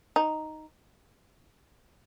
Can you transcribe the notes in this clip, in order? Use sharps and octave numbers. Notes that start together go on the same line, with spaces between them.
D#4